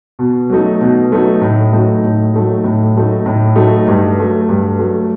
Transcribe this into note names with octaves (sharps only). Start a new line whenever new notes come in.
B2
F#3 A3 D#4
B2
F#3 A3 D#4
A2
F#3 A3 D#4
A2
F#3 A3 D#4
A2
F#3 A3 D#4
A2
F#3 A3 D#4
G2
F#3 A3
G2
F#3 A3